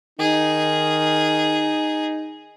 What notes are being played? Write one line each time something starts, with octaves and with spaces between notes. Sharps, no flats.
D#3 D#4 G#4